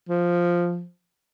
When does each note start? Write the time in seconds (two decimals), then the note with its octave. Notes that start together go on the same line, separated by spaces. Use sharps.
0.09 F3